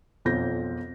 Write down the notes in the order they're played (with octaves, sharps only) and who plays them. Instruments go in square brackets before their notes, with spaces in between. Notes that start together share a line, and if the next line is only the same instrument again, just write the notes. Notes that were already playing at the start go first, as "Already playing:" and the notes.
[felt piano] E1 B1 F2 F4 G6 A#6